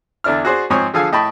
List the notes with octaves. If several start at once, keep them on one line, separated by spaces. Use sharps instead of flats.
E2 D3 D4 E4 F6
F#4 G#4 C5 D5
G#2 F3 C4 C#5 G#5 D#6
D3 F3 G#4 A4 F5 G#5
A2 D#5 G5 A5 B5 C#6